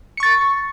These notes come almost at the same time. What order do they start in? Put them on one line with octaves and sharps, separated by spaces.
C#7 C#6 A6